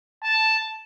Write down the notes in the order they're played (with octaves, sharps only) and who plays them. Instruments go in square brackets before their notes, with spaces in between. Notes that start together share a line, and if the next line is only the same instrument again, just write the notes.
[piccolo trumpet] A5